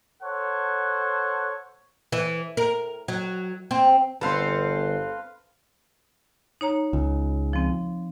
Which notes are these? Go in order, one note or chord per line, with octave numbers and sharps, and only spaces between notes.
A4 C5 C#5 F#5
E3
A#4
F#3
C4
G1 C4 A4 B4 F5 C6
D#4 C#5 A#5
C#2
F3 C4